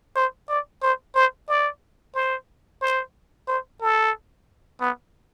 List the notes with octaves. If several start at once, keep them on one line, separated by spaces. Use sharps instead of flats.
C5
D5
C5
C5
D5
C5
C5
C5
A4
B3